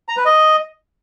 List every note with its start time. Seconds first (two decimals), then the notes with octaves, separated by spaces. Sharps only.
0.09 A#5
0.17 B4
0.25 D#5